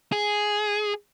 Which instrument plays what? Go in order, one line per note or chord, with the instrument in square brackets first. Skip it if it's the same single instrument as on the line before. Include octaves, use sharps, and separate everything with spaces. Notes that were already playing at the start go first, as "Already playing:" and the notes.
[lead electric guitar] G#4